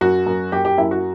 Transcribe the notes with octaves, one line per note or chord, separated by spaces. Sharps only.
F#2 F#4
F#2
F#2 G4
G4
F#2 E4
F#4